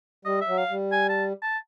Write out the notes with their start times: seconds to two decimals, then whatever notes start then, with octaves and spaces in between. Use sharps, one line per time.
0.25 G3 D#5
0.41 E5
0.47 F#3
0.59 F5
0.70 G3
0.92 G#5
1.09 A5
1.42 A5